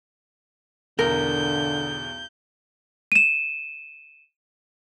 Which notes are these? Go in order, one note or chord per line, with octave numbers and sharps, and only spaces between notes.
B1 E2 D3 A#4 G6
D#7 E7